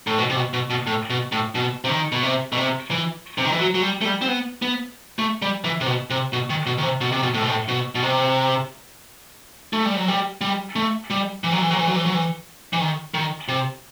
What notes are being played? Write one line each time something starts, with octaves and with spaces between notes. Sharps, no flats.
A2
B2
C3
B2
B2
B2
A2
B2
A2
B2
C3
D#3
B2
C3
B2
C3
E3
C3
D#3
E3
F#3
F#3
G3
A3
G3
C4
B3
B3
A3
G3
E3
C3
B2
C3
B2
D#3
B2
D#3
C3
B2
C3
B2
A2
B2
A2
B2
B2
C3
A3
G3
F#3
G3
G3
A3
G3
E3
F#3
E3
F#3
E3
F#3
E3
F#3
E3
E3
D#3
D#3
C3